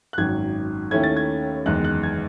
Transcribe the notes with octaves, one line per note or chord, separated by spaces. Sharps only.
F#6
G#1 F#2 D#3 G#6
D#2 D#3 A3 C#4 E4 G#6
A6
G#6
F#1 E2 D#3 G#3 F#6
F#6
G#6